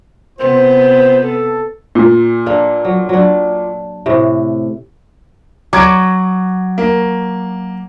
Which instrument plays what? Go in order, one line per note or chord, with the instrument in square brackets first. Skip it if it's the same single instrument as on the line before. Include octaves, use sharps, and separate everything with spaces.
[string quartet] C3 B3 [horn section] F4 C5
[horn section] A4
[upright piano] A#2
[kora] A#3 D4 A4
F#3
F#3 D4
A2 C3
[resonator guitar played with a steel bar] F#3 [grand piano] D6 G#6 D7
[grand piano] A#3